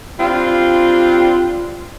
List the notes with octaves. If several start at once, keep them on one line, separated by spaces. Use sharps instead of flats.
G3 C4 D4 F4